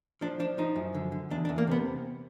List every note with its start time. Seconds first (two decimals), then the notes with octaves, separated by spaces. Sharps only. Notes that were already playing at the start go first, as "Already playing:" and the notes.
0.21 F3 D4
0.40 F3 D4
0.58 F3 D#4
0.76 F#2
0.95 D3
1.12 D3
1.31 E2 D4
1.45 D4
1.49 E2
1.58 A#3
1.67 C3 B3